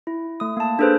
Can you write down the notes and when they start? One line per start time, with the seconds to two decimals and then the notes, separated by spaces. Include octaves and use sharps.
0.07 E4
0.40 A3 D#6
0.57 A#3 A5
0.79 D4 G#4 A4 B4 C5